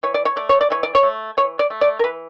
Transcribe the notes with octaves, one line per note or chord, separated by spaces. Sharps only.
E3 C#5
D5
C#5
A3 D5
C#5
D5
E3 C#5
D5
C#5
A3
E3 C#5
D5
A3
D5
A#4
E3 B4